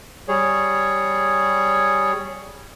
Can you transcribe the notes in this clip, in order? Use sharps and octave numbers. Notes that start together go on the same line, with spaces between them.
G3 G#4 C#5